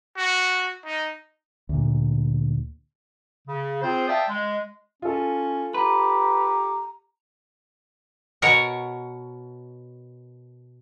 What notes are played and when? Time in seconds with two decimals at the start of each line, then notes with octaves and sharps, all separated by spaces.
0.17 F#4
0.85 D#4
1.69 D2 A#2
3.48 C#3
3.82 C4 F4 G#4 C5
4.08 D5 E5 F5 G5 A5 D#6
4.28 G#3
5.02 C#4 F4 A4
5.74 G4 B4 A#5
8.42 B2 A#4 C#5 F#5